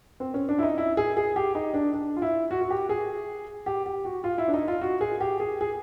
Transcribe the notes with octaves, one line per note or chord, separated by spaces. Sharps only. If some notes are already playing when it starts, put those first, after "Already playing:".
C4
C#4
D4
E4
D#4
E4
G#4
G#4
G4
D#4
D4
D4
F4
E4
F#4
F#4
G4
G#4
G4
G4
F#4
F4
E4
D4
D#4
F4
F#4
G#4
G4
G#4
G#4